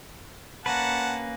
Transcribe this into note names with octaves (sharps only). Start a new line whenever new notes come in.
A#3 C#4 B4 F#5 A5